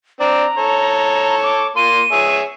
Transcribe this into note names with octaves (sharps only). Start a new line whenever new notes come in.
C4 D4 D5 A#5
A4 C#5
D6
A#3 F4 C6 D#7
G#4 C#5 E5